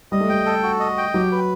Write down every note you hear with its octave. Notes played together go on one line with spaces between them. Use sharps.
G3 D#5
A3
G3 G5
A4
F#4
D#5
G5
F#3 G4
B4